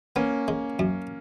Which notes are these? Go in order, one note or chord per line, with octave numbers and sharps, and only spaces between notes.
A#3 B3 C#4
G#3
F#2